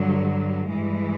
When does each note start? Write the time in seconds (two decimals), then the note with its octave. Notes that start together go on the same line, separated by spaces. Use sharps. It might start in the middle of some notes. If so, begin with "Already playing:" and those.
Already playing: G2 D3 F#3
0.70 G2 E3 G#3